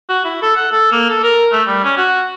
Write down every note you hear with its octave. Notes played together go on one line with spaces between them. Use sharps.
F#4
E4
A4
F#5
A4
A#3
A4
A#4
A3
G3
C#4
F#4